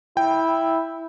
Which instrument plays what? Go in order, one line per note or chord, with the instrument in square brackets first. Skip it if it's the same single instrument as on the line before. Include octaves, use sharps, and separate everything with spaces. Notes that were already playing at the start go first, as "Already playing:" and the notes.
[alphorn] E4 [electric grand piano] G5